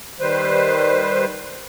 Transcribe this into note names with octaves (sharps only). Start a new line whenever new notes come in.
D#3 G3 B4 C5